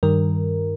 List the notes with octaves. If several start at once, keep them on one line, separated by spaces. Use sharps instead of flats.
G2 D#3 G3 A#4